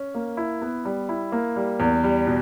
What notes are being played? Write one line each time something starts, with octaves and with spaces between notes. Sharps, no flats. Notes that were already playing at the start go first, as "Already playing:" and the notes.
Already playing: C#4
A#3
E4
B3
G3
E4
A#3
G3
E2
G3
B2